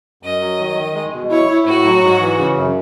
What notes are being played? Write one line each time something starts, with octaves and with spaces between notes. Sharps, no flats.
F#2 D#5
F#3
D#3
D#3
G#3
B2
E4 C#5
E4
A2 F#4
F#3
G#2
E3
C#3
F#2